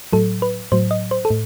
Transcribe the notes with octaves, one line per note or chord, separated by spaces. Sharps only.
A2 F#3 A4
B4
A2 F#3 C5
D#5
C5
A4
A2